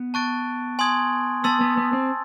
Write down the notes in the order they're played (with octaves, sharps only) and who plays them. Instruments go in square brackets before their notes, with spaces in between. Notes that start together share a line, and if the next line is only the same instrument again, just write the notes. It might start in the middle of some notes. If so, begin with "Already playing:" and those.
Already playing: [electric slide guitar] B3
[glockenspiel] A5 C#6 F#6 A6 D7
G#5 C6 D#6 G#6
[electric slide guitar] B3 [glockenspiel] A5 C6 E6 A6
[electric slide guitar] B3
B3
C4